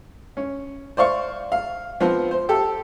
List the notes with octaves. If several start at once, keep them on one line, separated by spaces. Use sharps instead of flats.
C#4
C5 D5 F5 C#6
F5
F3 B3 C4
C5
G4 A4